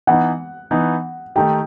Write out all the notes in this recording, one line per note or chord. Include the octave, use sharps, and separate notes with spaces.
E3 B3 D#4 F#5
E3 B3 D#4
D#3 A3 D#4 G4 G5